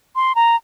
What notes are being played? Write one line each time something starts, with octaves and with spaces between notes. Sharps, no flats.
C6
A#5